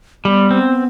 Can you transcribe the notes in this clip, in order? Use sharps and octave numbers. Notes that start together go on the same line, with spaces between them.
G3 B3
C4